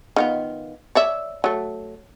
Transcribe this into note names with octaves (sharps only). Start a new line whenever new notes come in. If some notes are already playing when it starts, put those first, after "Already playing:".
D#3 B3 F4
C#5 D5 E5
F#3 A3